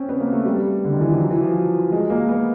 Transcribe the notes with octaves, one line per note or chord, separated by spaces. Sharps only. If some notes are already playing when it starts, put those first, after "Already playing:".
Already playing: C4 C#4
B3
A#3
A3
G3
D3
D#3
E3
F3
F#3
E3
F3
G#3
A#3
B3